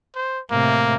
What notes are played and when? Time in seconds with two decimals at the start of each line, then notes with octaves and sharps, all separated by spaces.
0.15 C5
0.51 A2 C3 A#3